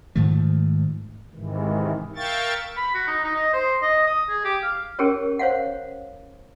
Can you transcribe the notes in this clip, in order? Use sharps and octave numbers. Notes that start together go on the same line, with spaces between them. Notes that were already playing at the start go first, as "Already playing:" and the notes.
G#2 D#3 F3 A3
G#2 C3 D#3 E3
A#4 E5 F5 G5 C#6 A6
B5
F#4
D#4
D#4
D#5
C5
D#5
D#6
G#4
G4
F5
C#4 G4 G#4 A#4 C#5
C5 C#5 F5 F#5